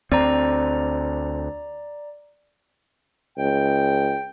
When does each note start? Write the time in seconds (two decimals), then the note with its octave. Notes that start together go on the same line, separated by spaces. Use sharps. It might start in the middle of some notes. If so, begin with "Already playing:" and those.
0.12 D2 C4 D5 A#5
3.38 C#2 G5